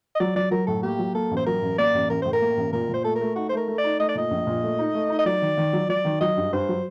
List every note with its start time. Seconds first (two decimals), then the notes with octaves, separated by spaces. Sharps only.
0.15 D#5
0.20 F#3 D5
0.36 F#3 D5
0.51 F#3 A#4
0.67 A2 A4
0.83 A#3 G4
0.99 F#3
1.15 A#3 A4
1.31 A1
1.37 C5
1.46 F#3 A#4
1.62 A1
1.78 A#3 D5
1.94 A1
2.10 A1 A#4
2.22 A2 C5
2.33 A#4
2.42 A#3
2.57 A1
2.73 A#2 A#4
2.89 A#2 C5
3.04 A3 A4
3.15 A#4
3.21 A3
3.36 D#4 F#4
3.49 C5
3.53 A3 A#4
3.68 A3
3.78 D5
3.84 D#4
4.00 A3 D#5
4.09 D5
4.15 A#2 D#5
4.31 A#1
4.47 A#2
4.63 A3
4.79 D#4
4.95 A3
5.10 D#4
5.19 D#5
5.25 F#3 D5
5.42 D#3
5.57 D#3
5.73 F#3
5.89 F#3 D5
6.05 D#3
6.21 F#3 D#5
6.37 G2
6.52 G2 C5
6.68 F#3